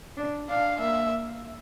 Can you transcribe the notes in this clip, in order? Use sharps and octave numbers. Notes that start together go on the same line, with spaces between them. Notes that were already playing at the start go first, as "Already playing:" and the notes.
D4
D4 F5
A#3 E5